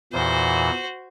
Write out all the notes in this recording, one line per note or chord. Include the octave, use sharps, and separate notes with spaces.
E2 A#2 E3 F#4 C5